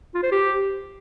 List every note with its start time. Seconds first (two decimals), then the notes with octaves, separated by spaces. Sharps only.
0.15 F4
0.23 C5
0.32 G4